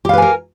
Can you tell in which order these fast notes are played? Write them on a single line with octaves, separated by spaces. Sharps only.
G4 F5 B4 G#5 A#4